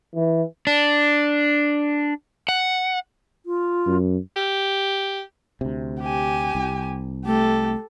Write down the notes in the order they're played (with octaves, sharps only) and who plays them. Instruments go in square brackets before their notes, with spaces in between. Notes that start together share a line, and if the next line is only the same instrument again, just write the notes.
[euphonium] E3
[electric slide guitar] D4
F#5
[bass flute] F4
[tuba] F#2
[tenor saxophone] G4
[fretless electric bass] D2 C3
[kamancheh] G4 G#5
[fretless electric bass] C2
[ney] A3 [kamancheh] G4 A4